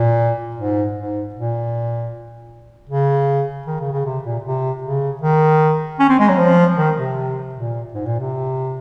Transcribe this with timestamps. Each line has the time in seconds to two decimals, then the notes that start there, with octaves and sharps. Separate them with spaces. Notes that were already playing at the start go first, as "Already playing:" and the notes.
Already playing: A#2
0.56 G#2
0.96 G#2
1.34 A#2
2.89 C#3
3.67 D#3
3.80 C#3
3.92 C#3
4.06 C3
4.24 A#2
4.44 C3
4.83 C#3
5.22 D#3
5.99 C#4
6.09 C4
6.20 G#3
6.29 F#3
6.38 F3
6.77 D#3
6.97 C3
7.55 A#2
7.94 G#2
8.06 A#2
8.19 C3